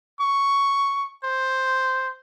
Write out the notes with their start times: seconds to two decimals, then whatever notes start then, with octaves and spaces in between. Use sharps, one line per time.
0.21 C#6
1.24 C5